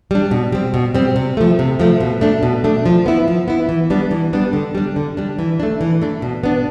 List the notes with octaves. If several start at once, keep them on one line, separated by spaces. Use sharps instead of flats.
G3 D4
B2
G3 C4
B2
G3 C4
C3
F3 A3
C3
F3 A3
B2
A3 D4
B2
A3 D4
F3
B3 E4
F3
B3 E4
E3
G3 B3 D4
E3
G3 B3 D4
D3
G3 D4
D3
G3 D4
E3
A3 D4
E3
A3 D4
B2
B3 D4